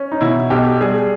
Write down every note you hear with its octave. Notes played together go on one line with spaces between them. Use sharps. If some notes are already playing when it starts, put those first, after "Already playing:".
Already playing: C#4
D#4
B2 E4
B1 G4
G3 G#4